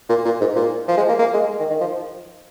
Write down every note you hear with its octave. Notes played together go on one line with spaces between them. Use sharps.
A#2
A#2
G#2
A#2
F3
G#3
A#3
A#3
G#3
D#3
D#3
F3